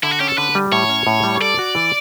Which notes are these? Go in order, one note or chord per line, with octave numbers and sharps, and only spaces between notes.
D3 E4
F#4
C#4 G4
A4
D3 B4
G3
A2 C#5
C#4
A2
G3
A4 D5
F#4
E3